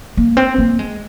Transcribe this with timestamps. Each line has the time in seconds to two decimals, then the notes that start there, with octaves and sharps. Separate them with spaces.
0.17 A#3
0.37 C4
0.58 A#3
0.79 G#3